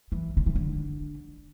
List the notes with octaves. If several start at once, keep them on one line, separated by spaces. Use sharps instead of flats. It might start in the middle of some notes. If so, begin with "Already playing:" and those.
E3
D3
E3
D3